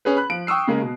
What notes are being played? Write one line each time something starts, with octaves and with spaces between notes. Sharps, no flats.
C#4 G#4 B4
B5 F#6
F3 D7
G5 C#6 D#6 E6 C7
C#3 G#3 A#3
B2